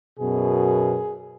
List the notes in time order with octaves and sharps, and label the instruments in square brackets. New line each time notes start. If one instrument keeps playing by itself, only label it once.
[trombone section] F#2 B2 [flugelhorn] G#4